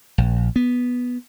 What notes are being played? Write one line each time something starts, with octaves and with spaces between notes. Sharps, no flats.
A#1
B3